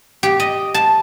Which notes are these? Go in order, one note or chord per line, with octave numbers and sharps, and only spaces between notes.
G4
D#5
A5